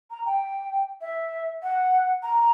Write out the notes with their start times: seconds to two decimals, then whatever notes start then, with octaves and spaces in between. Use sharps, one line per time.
0.10 A#5
0.26 G5
1.01 E5
1.63 F#5
2.23 A#5